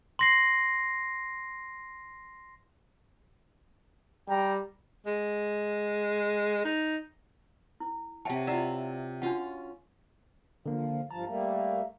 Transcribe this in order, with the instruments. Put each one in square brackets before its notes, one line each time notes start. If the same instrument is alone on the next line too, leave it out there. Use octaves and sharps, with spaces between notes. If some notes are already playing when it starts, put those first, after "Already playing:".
[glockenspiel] C6 A#6 C7
[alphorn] G3 [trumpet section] G5 A#5
[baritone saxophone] G#3
D#4
[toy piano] E4
[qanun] C3 C#5 [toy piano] E5 F#5 A5
[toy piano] E4 D5 F#5 [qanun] F4 E5
[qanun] C#4 F4 [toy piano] D4 F#4 F#5
[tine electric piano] D3 A#3 [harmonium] F3
[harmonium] G2 F3 A5 [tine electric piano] A#5
[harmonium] G3 A3 A#3